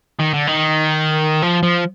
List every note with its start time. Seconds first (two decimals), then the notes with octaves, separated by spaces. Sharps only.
0.19 D#3
0.34 D3
0.47 D#3
1.42 F3
1.63 F3